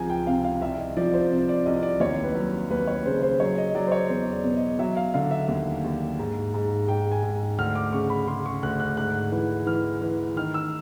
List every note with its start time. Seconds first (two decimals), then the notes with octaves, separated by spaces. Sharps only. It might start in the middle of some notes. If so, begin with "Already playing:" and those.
Already playing: C#2 C3 F3 G#5 A#5
0.10 G5
0.27 C3 F5
0.44 F5
0.61 C2 E5
0.78 D#5
0.97 F3 D5
1.13 C5
1.32 C3
1.49 D5
1.65 C2 D#5
1.83 D5
2.00 D#2 C#5
2.23 B4
2.35 F#3
2.70 D#2 B4
2.88 C#5
3.05 C#3 C5
3.22 C5
3.40 F#3 C#5
3.58 D#5
3.75 F#3 D5
3.87 C5
3.92 C#5
4.09 E2 C5
4.33 D5
4.44 B2
4.57 D#5
4.79 F#3 E5
4.97 F5
5.14 D3 F5
5.31 E5
5.48 D#2
5.84 D#2
6.19 G#2
6.54 G#2
6.88 G#2 G5
7.11 G#5
7.23 G#2
7.58 D2 F6
7.75 D6
7.93 C#3 C#6
8.10 B5
8.27 C#3 C6
8.46 C#6
8.63 D2 F#6
8.80 F#6
8.97 G#2 F#6
9.32 E3
9.66 E3 F6
10.01 E3
10.36 D#3 F6
10.54 E6